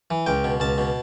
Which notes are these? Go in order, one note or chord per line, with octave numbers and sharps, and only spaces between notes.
E3
C#2 G5
B2
C#2 A5
B2